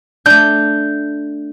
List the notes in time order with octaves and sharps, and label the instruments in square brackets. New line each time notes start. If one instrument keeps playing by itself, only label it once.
[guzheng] A3 D4 [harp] G6